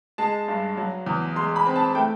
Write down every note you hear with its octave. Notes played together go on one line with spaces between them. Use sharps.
G#3 A5
G2
F#3
E2
G#3 C6
B5
C4
A5
A3 G5